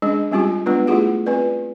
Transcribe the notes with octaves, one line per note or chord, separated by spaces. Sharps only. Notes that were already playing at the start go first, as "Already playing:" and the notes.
G#3 C#4 D4 G#4 D#5
G3 G#3 C4 C#4 F4 G4
G#3 B3 D4 F4 B4 D5
A3 E4 F4 G4 G#4 F#5
C4 F4 B4 D5